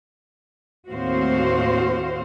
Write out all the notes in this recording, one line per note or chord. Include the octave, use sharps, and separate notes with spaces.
D#2 A2 C4 F#4 C5 F5